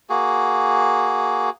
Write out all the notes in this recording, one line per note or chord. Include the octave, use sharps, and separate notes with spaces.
A#3 F#4 G#4